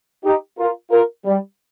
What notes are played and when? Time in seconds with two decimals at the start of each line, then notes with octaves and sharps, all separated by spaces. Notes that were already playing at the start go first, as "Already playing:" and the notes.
0.25 D#4 G4
0.59 F4 A#4
0.91 F4 A#4
1.25 G3